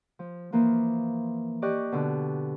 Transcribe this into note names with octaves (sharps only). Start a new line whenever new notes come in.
F3
E3 F3 A#3 F4
G4 D5 D#5 C#6 F#6
B2 D3